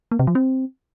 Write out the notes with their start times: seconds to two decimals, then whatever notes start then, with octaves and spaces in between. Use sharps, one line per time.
0.12 A#3
0.19 C3
0.27 F3
0.35 C4